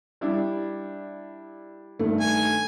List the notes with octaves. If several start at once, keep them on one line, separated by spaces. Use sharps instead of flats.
G3 D4 E4
G2 D#3 A3
G#5